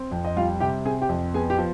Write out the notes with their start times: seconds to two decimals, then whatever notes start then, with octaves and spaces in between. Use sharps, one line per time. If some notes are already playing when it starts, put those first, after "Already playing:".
Already playing: C4
0.11 F2
0.25 D#5
0.37 G3 F4 F5
0.60 C3 G4 G5
0.85 C4 G#4 G#5
1.02 G4 G5
1.09 F2
1.34 B3 G#4 G#5
1.50 G4 G5
1.58 F3